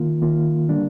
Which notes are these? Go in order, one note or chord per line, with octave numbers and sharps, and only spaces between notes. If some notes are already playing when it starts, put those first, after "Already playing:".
Already playing: D#3 A#3 F4
D#3 A#3 F4
D3 G3 A#3 D4